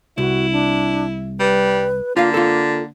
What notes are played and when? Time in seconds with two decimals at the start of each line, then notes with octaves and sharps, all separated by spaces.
0.18 C2 E4 F#4
0.52 D4
1.39 G3 B4
2.17 D3 A#3 F4 F5
2.34 F4 A4